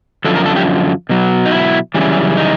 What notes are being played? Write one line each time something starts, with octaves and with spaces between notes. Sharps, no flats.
F#2 D3 F3 A4
A#4
A4
G4
B2 F#3
D#4
E4
F#2 C#3 E3 G3
D#4